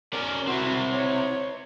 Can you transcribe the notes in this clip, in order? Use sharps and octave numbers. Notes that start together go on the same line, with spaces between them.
C#4 A#4 D5
C4 E4 F#4
C#5